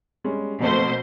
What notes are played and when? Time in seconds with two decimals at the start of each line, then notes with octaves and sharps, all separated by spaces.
0.24 G3 G#3 C#4
0.61 F2 B2 A3 A#3 C5